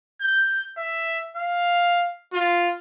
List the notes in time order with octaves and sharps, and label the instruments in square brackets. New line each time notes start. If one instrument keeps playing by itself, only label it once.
[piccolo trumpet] G6
E5
F5
F4